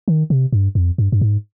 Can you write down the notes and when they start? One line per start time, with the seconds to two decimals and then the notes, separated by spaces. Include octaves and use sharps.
0.08 D#3
0.30 C3
0.53 G2
0.75 F2
0.98 G2
1.12 G2
1.21 G#2